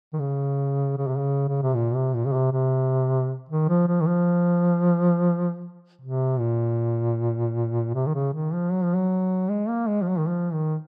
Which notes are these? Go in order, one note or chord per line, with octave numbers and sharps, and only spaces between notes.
D#3
C#3
C#3
C3
C#3
C#3
C3
A#2
C3
A#2
C#3
C3
C3
D#3
F3
F3
D#3
F3
C3
A#2
C3
D#3
C#3
D#3
F3
F#3
F3
F#3
G#3
A#3
G#3
F3
F#3
D#3
F3
D#3